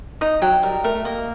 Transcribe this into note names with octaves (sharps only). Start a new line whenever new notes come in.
D#4 D#5
F#3 G5
G3 A#4
A3 A#4
A3
A#3 D#5